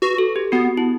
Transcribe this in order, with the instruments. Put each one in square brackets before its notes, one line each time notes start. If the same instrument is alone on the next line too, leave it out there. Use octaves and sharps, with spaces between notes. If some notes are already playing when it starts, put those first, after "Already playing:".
[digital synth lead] F#4 [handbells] B4
[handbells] A4
G4
[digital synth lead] B3 [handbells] F#4
[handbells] E4